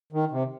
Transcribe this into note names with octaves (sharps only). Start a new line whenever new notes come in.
D#3
C3